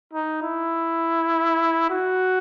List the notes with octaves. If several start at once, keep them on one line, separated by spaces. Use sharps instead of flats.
D#4
E4
F#4